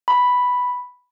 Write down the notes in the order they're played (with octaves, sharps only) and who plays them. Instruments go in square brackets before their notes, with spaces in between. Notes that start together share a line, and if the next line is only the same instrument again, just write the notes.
[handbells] B5